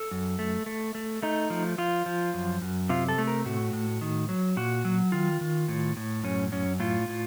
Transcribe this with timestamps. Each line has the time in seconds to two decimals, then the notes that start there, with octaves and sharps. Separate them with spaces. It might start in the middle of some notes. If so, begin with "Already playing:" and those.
Already playing: A4
0.11 F#2
0.39 A3
0.66 A3
0.95 A3
1.23 A3 D#4
1.50 F3
1.78 F3 F4
2.06 F3
2.34 F#2
2.62 F#2
2.89 C3 F4
3.09 A4
3.18 A3
3.27 A#4
3.45 A2 F#4
3.73 A2
4.01 D#3
4.29 F#3
4.57 A#2 F#4
4.85 F#3
5.12 D#3 F4
5.41 D#3
5.69 A2
5.97 A2
6.24 F#2 C#4
6.52 F#2 C#4
6.80 A2 F4
7.08 A2